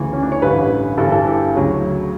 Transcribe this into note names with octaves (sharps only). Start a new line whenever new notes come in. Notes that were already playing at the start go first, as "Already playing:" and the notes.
Already playing: D2 C#3 E3
C#4
D4
C#5
A1 G2 D3 B4
G1 G2 E3 A4
A4
G4
D2 C#3 F#3